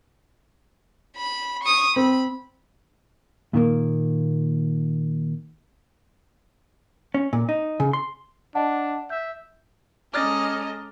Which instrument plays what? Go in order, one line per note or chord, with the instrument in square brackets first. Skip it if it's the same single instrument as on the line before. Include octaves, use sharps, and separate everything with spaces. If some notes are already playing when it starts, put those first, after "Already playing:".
[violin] B5
C#6 D#6
[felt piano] C4 [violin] B5
[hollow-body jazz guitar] A#2 D#3 A#3
C#4
A#2
D#4
C#3
C6
[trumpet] D4 [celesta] D#5 F#5 A5
[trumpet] E5 [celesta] G6
[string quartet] G#3 A4 A#5 [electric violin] C#4 [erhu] D#5 [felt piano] D6 F6 A6